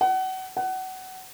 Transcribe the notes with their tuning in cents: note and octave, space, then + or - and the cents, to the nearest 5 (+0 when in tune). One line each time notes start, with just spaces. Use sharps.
F#5 +30
F#5 +25